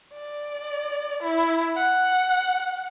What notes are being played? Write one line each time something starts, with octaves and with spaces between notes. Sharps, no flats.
D5
E4
F#5